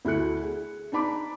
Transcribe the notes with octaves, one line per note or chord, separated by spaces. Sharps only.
D2 E4 F#4 A4 F#6 C#7
G#4
D4 D#4 A5 B5 D6